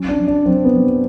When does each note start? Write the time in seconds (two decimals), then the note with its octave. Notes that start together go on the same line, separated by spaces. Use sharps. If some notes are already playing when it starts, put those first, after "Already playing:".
Already playing: F#3 C#4
0.08 D4
0.18 F#3
0.28 D4
0.46 F#3 C4
0.64 B3
0.74 F#3